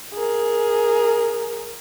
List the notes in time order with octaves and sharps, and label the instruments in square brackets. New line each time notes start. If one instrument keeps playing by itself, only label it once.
[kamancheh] G#4 A#4